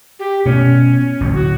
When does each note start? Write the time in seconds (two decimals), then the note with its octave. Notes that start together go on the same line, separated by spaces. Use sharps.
0.19 G4
0.45 B2 A3 C#4
1.20 D1 A1 A2
1.34 F#4